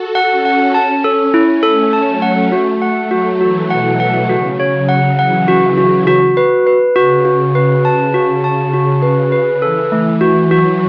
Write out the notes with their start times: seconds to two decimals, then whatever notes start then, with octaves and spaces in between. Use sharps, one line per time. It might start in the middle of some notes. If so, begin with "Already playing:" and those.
Already playing: F#4 A4
0.15 F#5
0.30 C#4
0.45 F#5
0.74 A5
1.04 A4
1.34 E4
1.63 A3 A4
1.93 A5
2.08 F#3
2.22 F#5
2.52 A3 F#4
2.82 F#5
3.11 F#3 F#4
3.41 E3 F#4
3.70 B2 F#5
4.00 F#5
4.29 C#3 F#4
4.60 C#5
4.74 F#3
4.89 F#5
5.18 E3 F#5
5.48 F#4
5.78 F#4
6.07 F#4
6.37 B4
6.67 B4
6.96 C#3 F#4
7.25 F#4
7.55 B4
7.85 A5
8.14 F#4
8.44 A5
8.73 F#4
9.02 B4
9.32 B4
9.62 E3 A4
9.92 A3
10.21 F#4
10.51 F#3 F#4